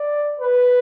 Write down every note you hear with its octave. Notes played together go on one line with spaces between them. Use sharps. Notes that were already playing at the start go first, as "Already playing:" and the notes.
Already playing: D5
B4